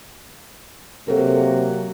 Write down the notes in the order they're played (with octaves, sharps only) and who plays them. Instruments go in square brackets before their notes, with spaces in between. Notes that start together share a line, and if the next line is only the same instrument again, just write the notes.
[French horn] C3 [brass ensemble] F#3 A#3 F#4 [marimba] A4 A#4